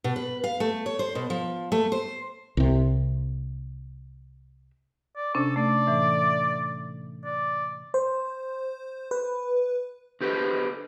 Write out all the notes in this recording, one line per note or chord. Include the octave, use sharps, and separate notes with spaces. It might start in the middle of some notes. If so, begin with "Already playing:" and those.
B2
B4
F5
A3
C#5
C5
B2
F3
A3
C5
C2 C3
D5
C3 C#4 D4 A4
A3 D5
A2 E3 E5
D5
C5
B4
D3 G4 B4 C5